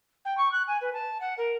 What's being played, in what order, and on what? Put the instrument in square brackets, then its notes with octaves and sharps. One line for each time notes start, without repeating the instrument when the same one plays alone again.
[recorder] G5
C#6
F#6
G#5
B4
A5
F#5
A#4